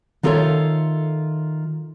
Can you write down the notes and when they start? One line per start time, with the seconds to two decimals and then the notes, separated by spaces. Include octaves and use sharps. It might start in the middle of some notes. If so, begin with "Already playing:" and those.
0.23 D#3 F4 A4 A#4 C#5 E5